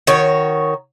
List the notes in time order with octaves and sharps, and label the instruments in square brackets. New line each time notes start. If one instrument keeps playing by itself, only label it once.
[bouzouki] D#3 F#4 C#5